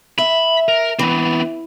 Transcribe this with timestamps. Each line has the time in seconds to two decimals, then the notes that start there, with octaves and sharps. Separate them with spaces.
0.18 E5 B5
0.69 A#4
0.99 E3 B3 C4